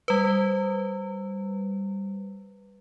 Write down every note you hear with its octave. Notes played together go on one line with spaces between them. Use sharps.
G3 B4